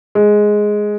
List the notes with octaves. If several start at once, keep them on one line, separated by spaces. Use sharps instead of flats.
G#3